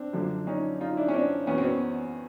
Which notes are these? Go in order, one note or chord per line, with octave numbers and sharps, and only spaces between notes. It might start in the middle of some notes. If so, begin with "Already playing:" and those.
Already playing: C4 D4
F#2 D3 F3
C#4 D#4
D#4 F4
D4 E4
C#4
C4 D4
E2 B2 B3 C#4
C4
B3 C#4